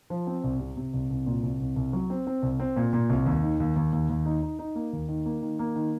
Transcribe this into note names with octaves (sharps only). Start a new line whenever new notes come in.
F3
C4
C2
C3
C3
C2
C2
A#2
C2
C2
C2
F#3
C4
C4
C2
C4
A#2
A#2
C2
D#2
D#3
D#2
D#2
D#2
D#2
D#4
D#4
D#4
A#3
D#2
D#3
A#3
D#3
A#3
D#3